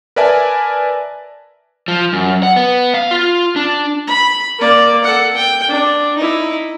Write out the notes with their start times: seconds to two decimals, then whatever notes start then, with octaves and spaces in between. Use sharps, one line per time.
0.16 A#4 B4 D5 E5 G#5 A5
1.88 F3
2.13 F#2
2.43 F#5
2.56 B3
2.94 F5
3.11 F4
3.56 D4
4.07 B5
4.58 A#3 D5
5.04 A4 F#5
5.35 G5
5.68 D4
6.17 D#4 E4